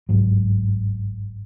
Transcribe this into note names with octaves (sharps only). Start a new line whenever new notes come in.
G1 C2 G#2 F#3